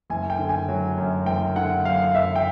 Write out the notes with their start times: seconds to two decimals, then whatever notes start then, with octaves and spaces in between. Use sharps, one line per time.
0.10 F#1 G#5
0.30 G5
0.39 D3
0.49 G#5
0.68 F#3
0.98 F#2
1.26 F#1 G5
1.56 D3 F#5
1.85 F#3 F5
2.14 F#2 E5
2.35 G5